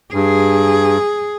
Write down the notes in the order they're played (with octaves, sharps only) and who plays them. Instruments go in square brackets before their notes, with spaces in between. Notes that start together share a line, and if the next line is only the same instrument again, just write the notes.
[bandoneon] G2 [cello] G#4